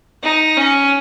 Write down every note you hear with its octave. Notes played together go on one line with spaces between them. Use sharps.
D#4
C#4